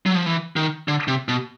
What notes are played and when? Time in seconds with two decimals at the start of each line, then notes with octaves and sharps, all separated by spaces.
0.06 F#3
0.15 F3
0.26 E3
0.56 D#3
0.88 D3
1.08 C3
1.28 B2